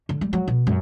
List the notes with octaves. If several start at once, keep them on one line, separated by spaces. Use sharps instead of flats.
D3
G3
F#3
B2
F#2